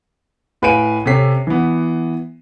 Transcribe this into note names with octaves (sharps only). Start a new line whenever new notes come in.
A2 B4 F5 G#5 D7 D#7
C3 C#4 A4 B6 C7
E3 B3